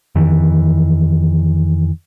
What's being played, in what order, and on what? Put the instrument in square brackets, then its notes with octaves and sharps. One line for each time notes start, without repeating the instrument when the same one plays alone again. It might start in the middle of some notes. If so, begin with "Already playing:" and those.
[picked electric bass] F2 D#3 E3